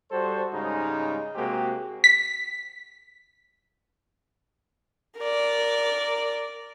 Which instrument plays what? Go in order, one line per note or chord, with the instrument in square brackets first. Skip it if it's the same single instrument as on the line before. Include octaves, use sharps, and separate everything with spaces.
[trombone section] G3 F#4 A4 C5
G#2 C#3 G3 G#3 D#4
C3 G#3 A#3 C4 F#4 G4
[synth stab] B6
[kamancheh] A#4 D5